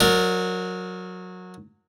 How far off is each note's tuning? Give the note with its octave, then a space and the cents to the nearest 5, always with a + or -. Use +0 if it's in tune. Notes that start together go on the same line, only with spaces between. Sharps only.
F#3 -20 A#4 -5 D5 +0